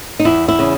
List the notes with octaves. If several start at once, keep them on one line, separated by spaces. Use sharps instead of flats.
D#4
E2 E4
E4
C#3